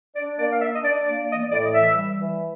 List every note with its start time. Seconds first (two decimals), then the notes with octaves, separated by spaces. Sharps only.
0.16 D4 D5
0.39 A#3 D5
0.50 F5
0.61 D4 E5
0.73 D#5
0.84 D4 D5
1.07 A#3 D5
1.29 E3 D#5
1.41 D5
1.52 A2 D5
1.63 D#5
1.74 E3 E5
1.97 G3
2.20 E3